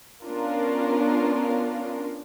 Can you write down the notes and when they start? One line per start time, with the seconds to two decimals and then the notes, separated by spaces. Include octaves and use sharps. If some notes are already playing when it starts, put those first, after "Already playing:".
0.24 B3 C#4 D4 F4 A#4